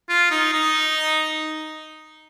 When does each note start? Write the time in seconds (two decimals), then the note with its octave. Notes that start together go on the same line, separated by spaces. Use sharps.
0.09 F4
0.31 D#4
0.53 D#4